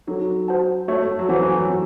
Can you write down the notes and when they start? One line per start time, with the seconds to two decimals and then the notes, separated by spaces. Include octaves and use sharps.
0.07 F#3 C4 D#4 F#4 A4
0.48 F#4 C5 F#5 A5
0.88 A3 F#4 C#5 E5 A5
0.98 A3
1.19 F#3
1.29 E3 C4 F#4 C5 F#5
1.42 E3
1.56 F#3
1.69 C4 F#4